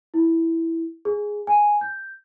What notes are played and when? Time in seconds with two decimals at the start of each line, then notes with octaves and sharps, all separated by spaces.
0.14 E4
1.05 G#4
1.47 G#5
1.81 G6